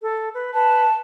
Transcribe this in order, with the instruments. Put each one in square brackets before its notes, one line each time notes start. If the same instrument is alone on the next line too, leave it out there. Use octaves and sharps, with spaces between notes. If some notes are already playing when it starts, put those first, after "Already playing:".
[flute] A4
B4
[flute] B4 [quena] A5